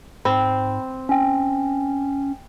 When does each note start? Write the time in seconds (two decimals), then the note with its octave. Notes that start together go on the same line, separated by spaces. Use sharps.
0.25 G#2 C4 B5
1.09 C#4 G5 G#5